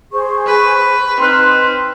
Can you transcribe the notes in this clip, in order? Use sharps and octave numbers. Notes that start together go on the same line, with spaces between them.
G#4 C5 C#6
B4
C4 D#4 B4 C6 F6 F#6